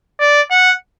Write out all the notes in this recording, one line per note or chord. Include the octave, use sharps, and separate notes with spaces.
D5
F#5